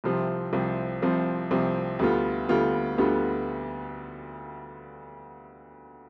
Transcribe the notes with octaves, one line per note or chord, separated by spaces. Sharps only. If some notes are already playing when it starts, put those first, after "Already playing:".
C2 C3 F3 C4
C2 C3 F3 C4
C2 C3 F3 C4
C2 C3 F3 C4
D2 D3 G3 B3 F4
D2 D3 G3 B3 F4
D2 D3 G3 B3 F4